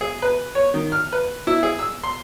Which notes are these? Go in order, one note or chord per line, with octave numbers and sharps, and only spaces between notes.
G#4
B4
C#5
D#3
F6
B4
E4
G#4
E6
C6